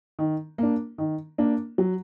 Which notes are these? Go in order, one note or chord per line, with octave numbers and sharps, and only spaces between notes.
D#3
A#3 D4
D#3
A#3 D4
F#3